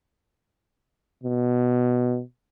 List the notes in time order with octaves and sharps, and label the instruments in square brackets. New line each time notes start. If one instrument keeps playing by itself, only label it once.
[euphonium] B2